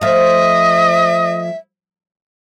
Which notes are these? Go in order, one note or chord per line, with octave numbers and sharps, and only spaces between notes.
F3 A3 D#5 E5